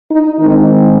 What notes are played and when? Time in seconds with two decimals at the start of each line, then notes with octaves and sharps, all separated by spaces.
0.10 D#4
0.39 D#3 G#3 C4 D#4